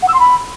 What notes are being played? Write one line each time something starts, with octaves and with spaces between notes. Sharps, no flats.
F#5
E6
C6
B5